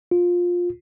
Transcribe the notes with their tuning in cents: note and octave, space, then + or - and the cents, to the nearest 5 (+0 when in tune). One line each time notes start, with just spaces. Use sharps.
F4 +15